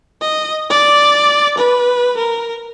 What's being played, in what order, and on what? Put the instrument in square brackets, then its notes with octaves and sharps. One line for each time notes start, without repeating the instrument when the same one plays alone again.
[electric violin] D#5
D5
B4
A#4